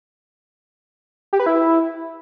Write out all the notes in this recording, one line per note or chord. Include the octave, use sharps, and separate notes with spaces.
G4
B4
E4